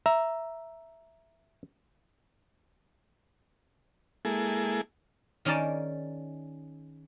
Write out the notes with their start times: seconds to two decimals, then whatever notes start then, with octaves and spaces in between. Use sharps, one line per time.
0.06 E5 A#5
4.25 G#3 A#3 E4 G#4 A4
5.45 D#3 C#4 G#4 A#4 D5 A5